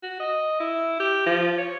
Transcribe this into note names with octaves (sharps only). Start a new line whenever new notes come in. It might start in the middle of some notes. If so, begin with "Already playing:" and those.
F#4
D#5
E4
G4
F3
C#5